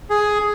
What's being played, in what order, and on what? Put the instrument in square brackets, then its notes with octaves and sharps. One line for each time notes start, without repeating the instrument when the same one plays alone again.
[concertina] G#4